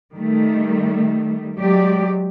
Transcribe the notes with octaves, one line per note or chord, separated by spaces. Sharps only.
D#3 G3 A3
F#3 G#3 G4 D5